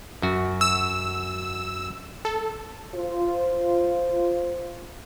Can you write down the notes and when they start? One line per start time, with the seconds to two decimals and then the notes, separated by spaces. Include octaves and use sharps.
0.22 F#2 F#4
0.61 E6
2.25 A4
2.95 F4 C5